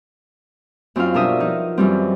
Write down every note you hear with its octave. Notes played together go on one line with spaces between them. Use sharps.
F#2 C4 D#4 F4 F5
G2 B2 D4 A#4 E5 D#6
F3 D#4
F#2 E3 G3 C4